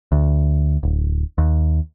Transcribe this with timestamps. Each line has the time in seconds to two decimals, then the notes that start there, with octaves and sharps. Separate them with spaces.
0.12 D2
0.83 D1
1.38 D#2